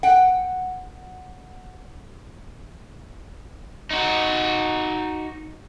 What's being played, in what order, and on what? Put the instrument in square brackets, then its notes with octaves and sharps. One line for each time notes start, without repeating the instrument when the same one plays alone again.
[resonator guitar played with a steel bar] F#5 G5
[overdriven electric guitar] D#4 F#4